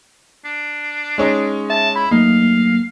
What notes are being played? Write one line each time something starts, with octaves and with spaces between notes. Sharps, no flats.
D4
G#3 C#4 D#4
E5 A5
E4 B5
F#3 A3 A#3 D#4 F5